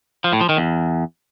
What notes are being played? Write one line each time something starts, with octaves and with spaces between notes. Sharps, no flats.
F3
A2
F3
D#3
E2